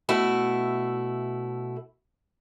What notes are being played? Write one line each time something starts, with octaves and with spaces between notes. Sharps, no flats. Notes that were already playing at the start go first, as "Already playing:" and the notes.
B2 A3 E4